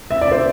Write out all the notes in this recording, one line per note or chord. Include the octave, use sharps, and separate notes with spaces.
E5
D5
C5